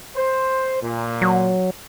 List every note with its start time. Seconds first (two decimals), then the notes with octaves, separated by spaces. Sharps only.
0.16 C5
0.82 A#2
1.22 F#3